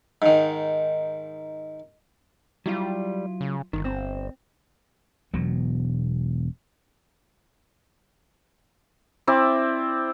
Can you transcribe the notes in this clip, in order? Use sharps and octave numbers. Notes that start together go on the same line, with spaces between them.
G#2 D#3
F#3 G3 E4 F4
C#3
G1 D#3
C4
E1 B2 F#3
C4 E4 D5 E5